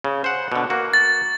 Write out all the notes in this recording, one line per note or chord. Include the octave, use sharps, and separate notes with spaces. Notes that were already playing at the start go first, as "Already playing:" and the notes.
C#3
C5 F#5
B2 D3
A#3 F#4
A6